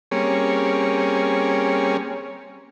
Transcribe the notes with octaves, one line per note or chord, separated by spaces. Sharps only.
G3 A#3 C4 C#4 G#4 C#5